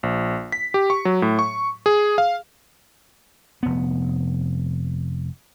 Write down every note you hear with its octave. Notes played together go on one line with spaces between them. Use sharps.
A#1
B6
G4
C#6
F#3
A2
C#6
G#4
F5
F1 B3